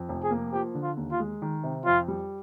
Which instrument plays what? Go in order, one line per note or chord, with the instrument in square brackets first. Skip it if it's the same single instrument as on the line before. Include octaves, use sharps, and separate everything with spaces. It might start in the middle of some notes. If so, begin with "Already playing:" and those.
Already playing: [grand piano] F2
F1
[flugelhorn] G#4
[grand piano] A#3
[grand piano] F3 [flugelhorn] G4
[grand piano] D3
[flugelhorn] F4
[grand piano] D#2
[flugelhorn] F4
[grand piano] G#3
D#3
C3
[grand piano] F2 [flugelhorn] F4
[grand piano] G3